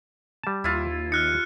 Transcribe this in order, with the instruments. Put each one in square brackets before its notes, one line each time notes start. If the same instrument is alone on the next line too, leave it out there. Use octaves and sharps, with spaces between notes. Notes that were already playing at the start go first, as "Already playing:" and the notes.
[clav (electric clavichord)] G3 A5
[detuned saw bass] D#2 [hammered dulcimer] E4 F4
[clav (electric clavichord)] D#4 [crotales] F6 F#6 C#7